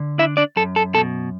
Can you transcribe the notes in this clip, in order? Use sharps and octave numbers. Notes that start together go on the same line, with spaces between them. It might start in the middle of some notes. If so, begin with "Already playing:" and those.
Already playing: D3
D4 E4 E5
D4 D5
F#2 A4
A4
B2 A4